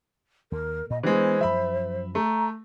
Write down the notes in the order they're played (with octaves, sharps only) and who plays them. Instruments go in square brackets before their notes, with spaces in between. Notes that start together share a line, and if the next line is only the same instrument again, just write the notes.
[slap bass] D#2 [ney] A#4
[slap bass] A#2 [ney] D#5
[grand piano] E3 G#3 [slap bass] B3 D4 [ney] C5
[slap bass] F#2 F3 [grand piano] E5 B5
[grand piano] A3 [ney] A#5